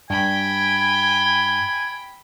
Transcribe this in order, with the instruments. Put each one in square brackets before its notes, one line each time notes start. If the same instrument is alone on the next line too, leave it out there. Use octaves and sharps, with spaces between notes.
[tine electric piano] G2 [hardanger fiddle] G5 B5 [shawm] G#5